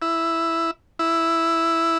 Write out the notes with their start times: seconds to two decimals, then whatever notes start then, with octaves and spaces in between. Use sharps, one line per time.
0.02 E4
0.99 E4